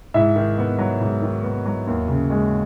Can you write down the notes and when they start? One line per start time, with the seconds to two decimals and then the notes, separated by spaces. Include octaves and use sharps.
0.14 G#2 E4 E5
0.36 D#3
0.58 B3
0.79 F#3
1.01 G#2
1.22 D#3
1.44 B3
1.65 F#3
1.87 D#2
2.08 C#3
2.30 G#3